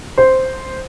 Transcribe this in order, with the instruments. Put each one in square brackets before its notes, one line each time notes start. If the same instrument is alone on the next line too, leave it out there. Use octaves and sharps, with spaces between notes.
[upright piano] C5